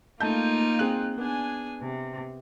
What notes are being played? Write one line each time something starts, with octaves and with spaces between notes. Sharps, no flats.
A3 A#3 D#4 F4 A5 G6
C4 G#4 F#6
B3 D4 G#4 G#5
C3